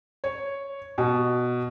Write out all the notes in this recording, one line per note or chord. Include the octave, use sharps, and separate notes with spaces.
C#5
B2